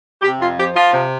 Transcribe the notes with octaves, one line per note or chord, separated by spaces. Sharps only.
C3 G4
F2 F4
F3 G4
F3 F4
C3